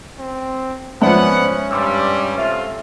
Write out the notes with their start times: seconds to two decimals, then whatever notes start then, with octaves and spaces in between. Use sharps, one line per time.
0.19 C4
1.02 G#2 F3 B3 C#4 C5 D5 E5 F#5
1.71 G2 G3 C6 D6 E6
2.38 C3 A3 F4 E5